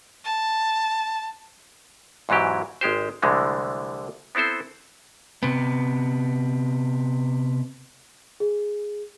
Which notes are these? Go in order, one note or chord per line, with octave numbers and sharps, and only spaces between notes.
A5
E2 G#2 E3 F#3 G4
G#1 G#3 G4 C5
C2 D3 E3 G#3 A3
B3 C4 E4 A4 C5
C3 B3
G#4